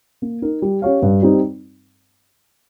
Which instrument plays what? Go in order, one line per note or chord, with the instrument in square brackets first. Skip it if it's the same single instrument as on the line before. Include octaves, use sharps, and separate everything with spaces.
[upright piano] A#3
D#4 A#4
G3
C#4 G4 C#5 F5
G2
G3 C4 D#4